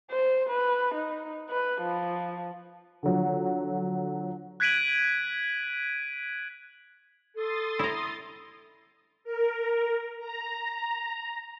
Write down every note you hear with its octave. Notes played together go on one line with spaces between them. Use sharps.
C5
B4
D#4
B4
F3
D3 F3 F#3
F#6 G#6 B6 D7 D#7 F#7
A4 C6 D#6 A6
E4 A#5
A#4
A#5